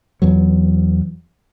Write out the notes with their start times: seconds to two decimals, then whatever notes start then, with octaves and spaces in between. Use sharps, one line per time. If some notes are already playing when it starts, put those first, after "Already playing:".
0.22 E2 E3 F#3